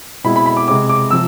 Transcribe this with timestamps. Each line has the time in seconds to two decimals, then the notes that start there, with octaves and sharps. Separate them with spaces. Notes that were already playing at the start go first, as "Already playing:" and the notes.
0.24 B2 G#3 C4 E4 B5
0.36 B5
0.46 B5
0.57 D6
0.68 C3 G#3 C4 D6
0.89 D6
1.11 C3 F3 E6